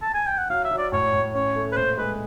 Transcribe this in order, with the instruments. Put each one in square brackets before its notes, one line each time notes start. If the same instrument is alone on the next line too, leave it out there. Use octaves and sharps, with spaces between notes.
[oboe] A5
G#5
G5
F#5
[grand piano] F#3 [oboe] F5
[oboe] E5
[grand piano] F#3
[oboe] D5
[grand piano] A2 [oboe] C#5
[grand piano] A2
[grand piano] C#4 [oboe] C#5
[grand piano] A3
[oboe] B4
[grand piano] A#2 [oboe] C5
[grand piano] G#3 [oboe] B4